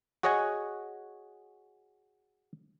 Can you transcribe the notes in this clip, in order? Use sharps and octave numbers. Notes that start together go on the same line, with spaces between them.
F#4 G#4 C#5 D#5 F#5 G#5